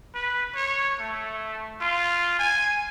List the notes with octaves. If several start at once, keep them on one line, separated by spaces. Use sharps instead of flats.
B4
C#5
A3
F4
G#5